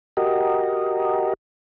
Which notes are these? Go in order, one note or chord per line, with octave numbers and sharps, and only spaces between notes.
F#4 G4 A#4 D#5